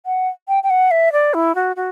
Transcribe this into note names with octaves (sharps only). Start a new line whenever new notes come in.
F#5
G5
G5
F#5
E5
D5
E4
F#4
F#4